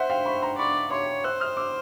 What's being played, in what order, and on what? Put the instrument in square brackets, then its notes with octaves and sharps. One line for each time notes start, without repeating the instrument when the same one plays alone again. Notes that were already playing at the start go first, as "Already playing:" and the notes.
Already playing: [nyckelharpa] C5 [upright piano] E5 F#5
[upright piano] F5 G5
B5 C#6
A#5 C6
[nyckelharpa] D5 [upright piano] B5 C#6
[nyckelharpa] C#5 [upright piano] C6 D6
[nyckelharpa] C5 [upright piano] E6 F#6
[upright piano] D#6 F6
D6 E6